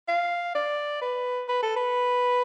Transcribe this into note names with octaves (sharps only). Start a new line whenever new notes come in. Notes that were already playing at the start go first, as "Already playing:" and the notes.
F5
D5
B4
B4
A4
B4